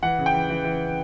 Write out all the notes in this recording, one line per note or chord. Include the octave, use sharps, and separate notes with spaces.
E3 F#5
C#3
G5
E3
E3
E3